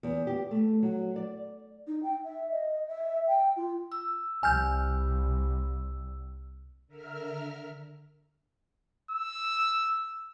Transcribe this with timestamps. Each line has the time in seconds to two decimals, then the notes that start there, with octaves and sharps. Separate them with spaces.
0.03 E2
0.27 G4
0.51 A3
0.83 F#3
1.16 D5
1.88 D#4
2.03 G5
2.24 E5
2.51 D#5
2.88 E5
3.27 G5
3.56 F4
3.92 E6
4.43 C2 G#5 F6 G6
6.87 D3 A#4 E5 F6
9.11 E6